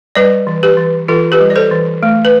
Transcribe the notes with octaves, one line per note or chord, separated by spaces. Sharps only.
G3 B4 D5
E3
G4 B4
E3
E3 F4 A4
G4 B4
G3
D5
A4 C5
E3
A3
B4